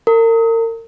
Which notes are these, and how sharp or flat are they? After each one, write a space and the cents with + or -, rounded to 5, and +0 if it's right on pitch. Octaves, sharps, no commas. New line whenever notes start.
A#4 -35